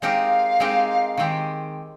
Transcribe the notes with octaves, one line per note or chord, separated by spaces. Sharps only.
G#3 C4 D#4 G4 A#4 F5
G#3 C4 D#4 G4 A#4
D#3 G#3 C4 G4